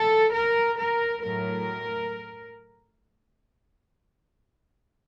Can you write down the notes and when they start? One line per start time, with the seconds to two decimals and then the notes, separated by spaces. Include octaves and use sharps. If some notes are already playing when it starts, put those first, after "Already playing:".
Already playing: A4
0.33 A#4
0.79 A#4
1.23 A2 F#3 A3 A#4